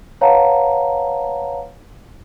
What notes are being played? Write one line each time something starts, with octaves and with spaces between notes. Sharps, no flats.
B4 C#5 F5 F#5 A5 A#5